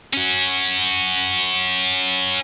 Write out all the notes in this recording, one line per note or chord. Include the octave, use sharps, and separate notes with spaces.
C#4 F#4